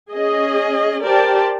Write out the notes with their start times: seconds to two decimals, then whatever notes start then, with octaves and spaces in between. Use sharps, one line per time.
0.11 C#4 G#4 D#5
1.04 G4 A#4 C5 D5 G5 A5